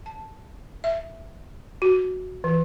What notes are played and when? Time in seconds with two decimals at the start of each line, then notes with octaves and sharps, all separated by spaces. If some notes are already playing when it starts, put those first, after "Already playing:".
0.06 A5
0.84 E5
1.82 F#4
2.44 E3